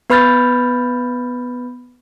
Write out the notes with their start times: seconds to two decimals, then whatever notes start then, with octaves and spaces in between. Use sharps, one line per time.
0.10 B3 B4 B5 F6 G6 A6